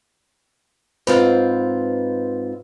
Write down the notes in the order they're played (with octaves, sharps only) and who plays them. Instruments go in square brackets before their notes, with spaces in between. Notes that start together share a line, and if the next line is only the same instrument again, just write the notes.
[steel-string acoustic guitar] G#2 C4 F4 [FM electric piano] B4